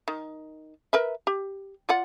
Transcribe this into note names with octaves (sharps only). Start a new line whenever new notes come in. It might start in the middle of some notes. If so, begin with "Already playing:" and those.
D#3
A#4 B4 E5
G4
F4 D5 F#5